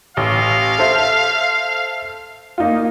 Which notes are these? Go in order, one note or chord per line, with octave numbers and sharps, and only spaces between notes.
A1 F5
A4 C5 E5
A#3 D#4 F4